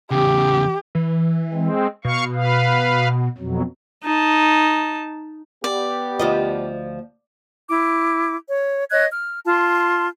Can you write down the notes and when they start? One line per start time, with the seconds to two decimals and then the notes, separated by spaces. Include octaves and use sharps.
0.11 E2 C#3 G4
0.95 E3
1.53 G#3 C4
2.04 B2 F5 C#6
2.35 B4 F5
3.38 F2 B2 F#3
4.04 D#4 A5
5.64 B3 G4 D5
6.19 D2 F3 D#5
7.69 E4 D6
8.48 C#5
8.91 C#5 D#5 F#6 G#6
9.12 F6
9.47 F4 A5 C6